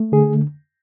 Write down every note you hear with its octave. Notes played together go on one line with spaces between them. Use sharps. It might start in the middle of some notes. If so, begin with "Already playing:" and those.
Already playing: A3
D3 G#4